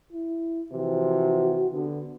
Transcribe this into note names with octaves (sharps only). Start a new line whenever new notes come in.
E4
C3 E3 F3 F#4
D3 B3